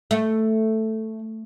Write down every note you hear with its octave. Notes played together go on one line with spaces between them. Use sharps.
A3